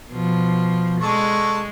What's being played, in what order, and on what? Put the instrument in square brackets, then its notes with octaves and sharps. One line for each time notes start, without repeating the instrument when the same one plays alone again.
[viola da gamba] B2 F3
[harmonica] D3 A5 C#6 [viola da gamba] G#3